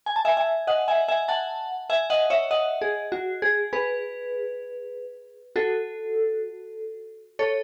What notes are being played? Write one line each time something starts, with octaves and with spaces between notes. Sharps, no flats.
G#5
A5
E5 G#5
E5 G#5
D#5 F#5
E5 G#5
E5 G#5
F#5 A5
E5 G#5
D#5 F#5
C#5 E5
D#5 F#5
G#4
F#4
G#4
G#4 B4
F#4 A4
A4 C#5